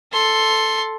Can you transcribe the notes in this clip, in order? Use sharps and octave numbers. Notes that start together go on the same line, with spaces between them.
A4 C6